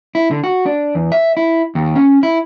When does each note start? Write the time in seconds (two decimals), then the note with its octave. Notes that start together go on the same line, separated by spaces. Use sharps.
0.15 E4
0.31 D3
0.44 F#4
0.66 D4
0.95 E2
1.12 E5
1.37 E4
1.75 D#2
1.95 C#4
2.23 E4